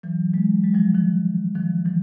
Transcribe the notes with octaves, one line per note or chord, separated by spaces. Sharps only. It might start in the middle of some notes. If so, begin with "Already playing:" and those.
E3 F#3
F#3 G#3
F#3 G#3
F3 G3
D#3 F3
D#3 F3
E3 F#3